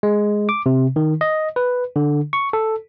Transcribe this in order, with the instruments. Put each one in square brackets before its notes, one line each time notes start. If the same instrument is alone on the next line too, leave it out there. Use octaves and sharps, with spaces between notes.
[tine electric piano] G#3
D6
C3
D#3
D#5
B4
D3
C#6
A4